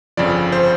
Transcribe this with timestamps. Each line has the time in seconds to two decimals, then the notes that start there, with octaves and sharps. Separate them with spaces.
0.17 G1 F2 C#3 F3 D5
0.52 C5